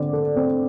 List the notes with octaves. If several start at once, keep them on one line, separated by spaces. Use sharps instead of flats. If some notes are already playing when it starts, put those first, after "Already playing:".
Already playing: D3 C4 D5
A4
C4